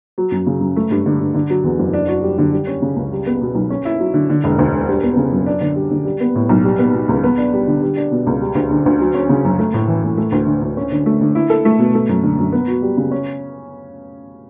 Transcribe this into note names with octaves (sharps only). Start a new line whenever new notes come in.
F#3
F#2
C#3
F#2
A3
G2
D3
G2
D3
F#3
E2
F#1
D4
F#4
G3
D3
G3
C#4
C#3
C#2
G3
B3
B2
B1
C#4
E4
F#3
D3
D3
E1
D2
E1
G3
B3
C#3
F#2
D4
D3
G3
D3
G3
B3
A2
B1
G3
B3
B2
C#2
B3
D4
G3
D3
G3
D4
B2
C#2
G3
D2
D3
D2
F#3
C#4
C#3
F#2
A3
A2
E3
A2
A3
D2
D3
D2
C#4
D3
A3
D3
E4
A4
A3
B2
A3
F#2
D3
F#2
B3
F#4
G3
C#3
C#4